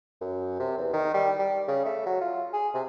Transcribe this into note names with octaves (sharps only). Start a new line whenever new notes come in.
F#2
C3
E2
D#3
G3
G3
C#3
A3
F#3
F4
G#4
C3